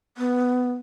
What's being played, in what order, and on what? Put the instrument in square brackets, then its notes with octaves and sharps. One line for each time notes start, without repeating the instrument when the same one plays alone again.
[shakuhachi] B3